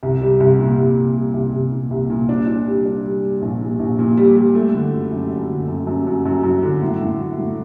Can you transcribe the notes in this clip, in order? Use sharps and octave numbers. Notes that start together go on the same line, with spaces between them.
C2
G3
C2
A#2
C2
C2
G3
C2
C2
A#2
C2
A#2
D4
D4
G3
D4
G3
G3
A#1
A#2
A#1
A#2
G3
G3
A3
D3
F#2
F#2
F#2
D3
F#2
F#2
F#2
F#2
F#2
D3
A2
A2
F#3
A2